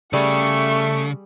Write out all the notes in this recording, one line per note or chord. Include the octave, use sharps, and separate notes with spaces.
C#3 G3 A3 G#4 D5 C#6